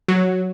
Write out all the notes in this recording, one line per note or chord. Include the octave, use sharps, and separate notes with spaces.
F#3